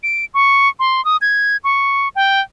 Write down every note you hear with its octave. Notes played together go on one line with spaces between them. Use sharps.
D7
C#6
C6
D#6
G#6
C#6
G5